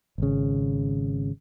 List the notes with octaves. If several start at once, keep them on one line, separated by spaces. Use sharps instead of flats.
G#1 C#3